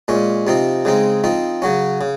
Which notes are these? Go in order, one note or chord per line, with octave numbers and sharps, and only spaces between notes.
A#2 G#3 C#4
C3 F3 C4 D#4
C#3 G#3 C4 D#4
F3 C4 D#4
C#3 F#3 C#4
C#3